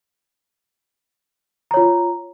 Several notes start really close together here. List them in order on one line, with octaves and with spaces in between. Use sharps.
A#5 C#5 F4